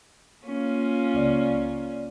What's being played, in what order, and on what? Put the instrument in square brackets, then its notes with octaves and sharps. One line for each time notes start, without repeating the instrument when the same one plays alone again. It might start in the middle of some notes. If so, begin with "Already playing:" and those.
[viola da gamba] A#3 C#4 F4
[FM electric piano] C#2 D5